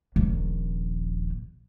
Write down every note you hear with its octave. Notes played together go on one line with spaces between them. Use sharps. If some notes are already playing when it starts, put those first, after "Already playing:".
D#1 A#1